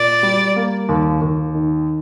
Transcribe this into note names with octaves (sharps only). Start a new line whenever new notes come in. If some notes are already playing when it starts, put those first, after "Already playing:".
Already playing: A#2 D5
G3
A#3
D#2
D#2
D#3